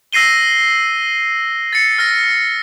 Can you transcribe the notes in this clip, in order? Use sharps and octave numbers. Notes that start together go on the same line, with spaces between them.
E6 A#6 C7 D#7 G7
A6 C#7
F6 A#6